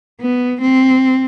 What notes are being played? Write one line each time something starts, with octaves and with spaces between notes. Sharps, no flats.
B3
C4